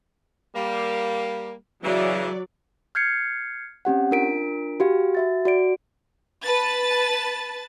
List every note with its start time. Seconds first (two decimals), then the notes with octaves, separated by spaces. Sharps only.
0.55 G3 A#3
1.83 C#3 E3 F#3 D5
2.95 F6 G6 G#6 C7 C#7
3.85 C4 C#4 G4 F#5
4.11 D4 F4 A#4 B6 D7
4.80 F#4 G4 F5
5.15 F#4 E5 A6
5.45 F#4 D5 D7
6.43 B4 A5 A6